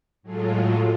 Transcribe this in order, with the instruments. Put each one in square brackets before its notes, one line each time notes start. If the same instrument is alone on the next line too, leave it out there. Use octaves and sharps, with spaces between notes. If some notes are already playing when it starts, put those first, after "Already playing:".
[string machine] A2 F#3 G#3 A3 F4